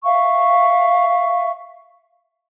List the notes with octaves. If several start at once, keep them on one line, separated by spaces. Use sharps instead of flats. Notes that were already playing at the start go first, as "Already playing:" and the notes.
E5 F5 C#6